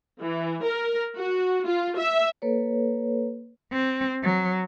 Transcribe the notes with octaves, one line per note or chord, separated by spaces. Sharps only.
E3
A#4
F#4
F4
E5
A#3 A4 B4 C#5
C4
F#3